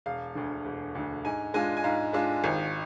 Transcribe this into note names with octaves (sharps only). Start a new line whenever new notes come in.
E1 F5
D2 D3
E1
D2 D3
G#2 G#5
G#3 D4 F4 G#5
G#5
G#2 F5
G#3 D4 F4
G#1